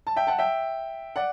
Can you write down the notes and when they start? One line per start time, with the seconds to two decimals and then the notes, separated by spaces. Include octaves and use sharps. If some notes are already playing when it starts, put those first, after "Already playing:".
0.07 A5
0.16 E5 G5
0.27 F#5 A5
0.38 E5 G5
1.16 D5 F#5